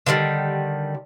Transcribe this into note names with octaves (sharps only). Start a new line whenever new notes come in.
D3 D#3 F#3 G3